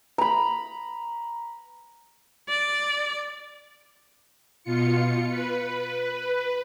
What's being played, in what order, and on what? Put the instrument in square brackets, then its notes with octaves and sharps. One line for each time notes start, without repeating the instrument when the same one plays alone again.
[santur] A#5 B5
[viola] D5
[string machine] B2 F4 C#7
B4